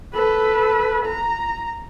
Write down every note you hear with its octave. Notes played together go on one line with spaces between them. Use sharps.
A4 B4
A#5